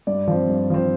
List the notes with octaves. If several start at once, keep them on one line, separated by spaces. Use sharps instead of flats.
G2 D5
F3 C4
G2
F3 C4